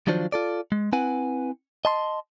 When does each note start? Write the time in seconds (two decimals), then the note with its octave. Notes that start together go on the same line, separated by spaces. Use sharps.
0.07 D#3 F3 F#3 D4 F4 C5
0.32 F4 A4 D5
0.72 G#3
0.93 C4 E4 B4 F#5 G#5
1.85 D#5 A5 C6